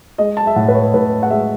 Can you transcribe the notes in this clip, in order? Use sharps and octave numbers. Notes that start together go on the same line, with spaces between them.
G#3 D#5
A5
E5
A2 F#5
B4
C#5
A2 B4
F#5
G#3 E5